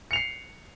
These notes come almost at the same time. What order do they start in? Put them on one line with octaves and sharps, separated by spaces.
C#7 F7 C7